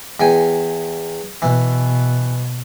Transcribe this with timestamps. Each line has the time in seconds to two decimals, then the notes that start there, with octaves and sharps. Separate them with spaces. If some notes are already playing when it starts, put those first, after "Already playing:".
0.20 E2 G5 G#5
1.42 B2 E3